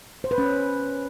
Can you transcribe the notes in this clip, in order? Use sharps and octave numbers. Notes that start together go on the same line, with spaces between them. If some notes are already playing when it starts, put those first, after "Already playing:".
C5
B4
C#4